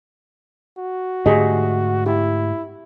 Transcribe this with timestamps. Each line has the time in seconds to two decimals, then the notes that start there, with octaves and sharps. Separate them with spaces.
0.78 F#4
1.26 G#2 D3 A3 G4 G#4 D#5
2.06 E4 G4